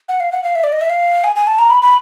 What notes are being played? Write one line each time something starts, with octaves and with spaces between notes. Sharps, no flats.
F#5
F5
F#5
F5
E5
D5
D#5
E5
F5
G#5
G#5
A5
A#5
B5
B5